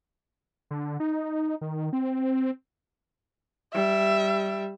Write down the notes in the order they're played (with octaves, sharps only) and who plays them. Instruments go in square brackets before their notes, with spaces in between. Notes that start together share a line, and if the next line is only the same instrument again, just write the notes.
[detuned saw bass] D3
D#4
D#3
C4
[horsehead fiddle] G3 [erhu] E5